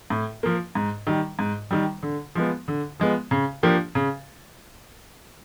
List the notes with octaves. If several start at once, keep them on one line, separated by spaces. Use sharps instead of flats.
A2
F3 A#3
G#2
D#3 G3
G#2
D#3 G3
D3
F3 G#3 B3
D3
F3 G#3 B3
C#3
F3 A#3 D4 G4
C#3